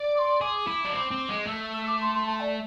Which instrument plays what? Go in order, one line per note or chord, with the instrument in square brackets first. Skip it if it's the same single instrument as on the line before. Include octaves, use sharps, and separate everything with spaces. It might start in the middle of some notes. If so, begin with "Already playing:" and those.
Already playing: [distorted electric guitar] D5
[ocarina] D6
C6
[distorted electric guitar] G#4 [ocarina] D6
[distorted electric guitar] E4
D4
C4
C4
G#3
[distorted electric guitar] A3 [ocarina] E6
[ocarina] E6
D6
C6
C6
A5
D5